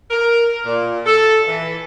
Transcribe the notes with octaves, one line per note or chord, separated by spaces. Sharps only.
A#4
A#2
A4
E3